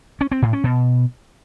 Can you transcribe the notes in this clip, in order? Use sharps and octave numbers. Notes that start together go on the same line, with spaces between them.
C#4
C4
A2
C#4
B2